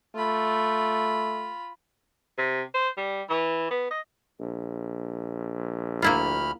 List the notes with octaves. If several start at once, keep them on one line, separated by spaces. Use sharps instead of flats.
A3 F4 B5
C3
C5
G3
E3
B3
D#5
A#1
D2 A#3 E4 F4 B5 F6